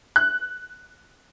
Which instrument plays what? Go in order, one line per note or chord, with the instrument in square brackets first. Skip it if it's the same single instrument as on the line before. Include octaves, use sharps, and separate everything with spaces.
[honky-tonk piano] F#6